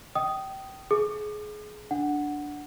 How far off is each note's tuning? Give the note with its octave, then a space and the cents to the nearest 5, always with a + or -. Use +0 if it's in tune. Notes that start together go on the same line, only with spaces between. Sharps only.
D#5 +0 G5 -25 D#6 +0
G#4 +25 D6 +40
D4 +0 F#5 +0